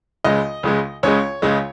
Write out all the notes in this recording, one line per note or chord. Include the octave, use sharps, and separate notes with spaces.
C#2 C#3 G#3 D#5
C#2 C#3 G#3
C#2 C#3 G#3 C#5
C#2 C#3 G#3